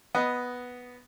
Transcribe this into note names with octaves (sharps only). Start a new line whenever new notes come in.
B3 D#5